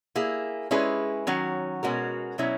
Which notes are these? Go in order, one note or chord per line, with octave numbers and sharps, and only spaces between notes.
A#3 E4 G#4
G#3 C#4 E4 G#4 B4
D#3 F#3 C#4 F#4 C#5
B2 G#3 C#4 F#4 A#4
B2 F#3 C#4 E4